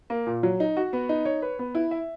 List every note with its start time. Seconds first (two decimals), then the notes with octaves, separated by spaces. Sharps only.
0.10 A#3
0.26 A#2
0.43 F#3
0.60 D#4
0.77 F#4
0.93 B3
1.09 D#4
1.25 C#5
1.42 B4
1.59 B3
1.75 E4
1.91 E5